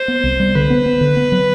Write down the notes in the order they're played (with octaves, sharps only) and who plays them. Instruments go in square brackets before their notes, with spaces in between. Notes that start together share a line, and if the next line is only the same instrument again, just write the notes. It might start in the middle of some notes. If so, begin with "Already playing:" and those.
Already playing: [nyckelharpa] C5
[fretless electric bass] B3
C2
G3
[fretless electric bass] D3 [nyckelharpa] B4
[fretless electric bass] B3
B3
D3
B3
F#3